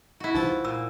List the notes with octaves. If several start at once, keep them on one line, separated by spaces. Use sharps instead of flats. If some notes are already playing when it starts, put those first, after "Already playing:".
E4 F#4
C2 E3 D#4 F4 C5 A6
A#2 E6